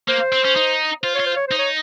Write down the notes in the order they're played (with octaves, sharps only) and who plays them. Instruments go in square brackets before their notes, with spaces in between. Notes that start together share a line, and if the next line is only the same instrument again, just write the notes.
[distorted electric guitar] A#3 [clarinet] C5
[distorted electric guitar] C4
C#4
D#4
[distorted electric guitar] F4 [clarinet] C5
[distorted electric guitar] F4 [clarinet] C#5
[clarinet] C5
C#5
[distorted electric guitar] D#4 [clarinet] C5
[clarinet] C#5